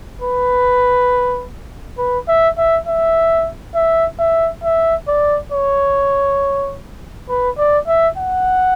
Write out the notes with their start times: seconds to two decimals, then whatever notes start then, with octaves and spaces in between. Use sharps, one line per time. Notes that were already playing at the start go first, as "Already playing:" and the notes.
0.22 B4
1.98 B4
2.28 E5
2.58 E5
2.88 E5
3.75 E5
4.19 E5
4.64 E5
5.08 D5
5.52 C#5
7.29 B4
7.58 D5
7.88 E5
8.18 F#5